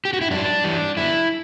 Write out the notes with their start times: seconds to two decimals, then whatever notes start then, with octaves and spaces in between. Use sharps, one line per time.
0.05 G4
0.13 F#4
0.22 E4
0.31 F#2 D4
0.64 E3 G3
0.97 F#2 E4